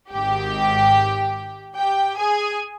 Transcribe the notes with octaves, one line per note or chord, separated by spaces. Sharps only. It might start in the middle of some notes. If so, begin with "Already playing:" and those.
G#1 G#2 D#3 G4 G5
G4 G5
G#4 G#5